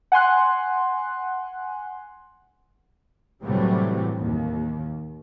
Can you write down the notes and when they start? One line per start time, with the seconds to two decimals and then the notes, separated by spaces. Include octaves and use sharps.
0.12 F#5 G#5 C6 F#6
3.43 A2 C3 E3 F#3 G3 A3
4.20 D#2